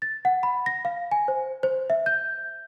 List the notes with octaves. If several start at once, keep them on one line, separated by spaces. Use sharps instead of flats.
A6
F#5
B5
A#6
F5
G#5
C5
C5
E5
G6